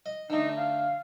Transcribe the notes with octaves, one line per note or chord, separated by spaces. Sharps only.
D#5
D3 A3 D#4
F5